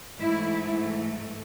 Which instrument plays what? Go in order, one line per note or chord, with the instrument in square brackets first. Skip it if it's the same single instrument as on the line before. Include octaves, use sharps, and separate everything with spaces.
[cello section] G#2 E3 A3 E4